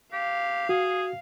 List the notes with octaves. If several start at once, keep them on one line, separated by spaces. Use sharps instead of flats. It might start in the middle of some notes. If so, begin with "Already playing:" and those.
G4 F5
F#4 G#4